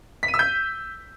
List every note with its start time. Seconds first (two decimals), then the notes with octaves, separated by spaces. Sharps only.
0.23 B6
0.28 D#7
0.34 E6
0.39 G6